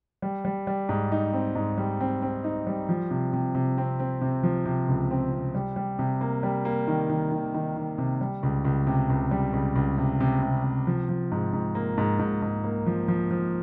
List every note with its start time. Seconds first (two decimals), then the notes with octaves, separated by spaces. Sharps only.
0.22 G3
0.45 G3
0.67 G3
0.89 G#2
1.12 D#4
1.33 C4
1.55 G#2
1.78 G3
2.01 C4
2.22 C4
2.44 D#4
2.67 G3
2.89 F3
3.11 C3
3.33 C3
3.55 C3
3.78 C4
4.00 C4
4.22 C3
4.43 F3
4.66 C3
4.88 C#2
5.11 C4
5.33 C3
5.55 G3
5.76 G3
5.99 C3
6.21 A#3
6.43 G3
6.65 A#3
6.88 D#3
7.09 D#3
7.32 D#3
7.54 D#3
7.76 D#3
7.98 C3
8.21 G3
8.43 C#2
8.65 C#2
8.87 C3
9.10 C#2
9.31 G3
9.53 C#2
9.76 C#2
9.98 C3
10.21 C3
10.43 C3
10.64 C3
10.87 F3
11.09 F3
11.31 G#2
11.53 G#2
11.75 A#3
11.98 G#2
12.19 G#2
12.42 G#2
12.64 A#3
12.86 F3
13.08 F3
13.31 F3